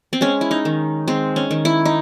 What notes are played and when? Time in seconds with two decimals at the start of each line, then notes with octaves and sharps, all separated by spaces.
0.13 C4
0.21 G#3 C#4
0.41 E4
0.51 D#4
0.65 D#3
1.08 G#3 C4
1.36 C#4
1.51 D#3
1.65 E4
1.85 D#4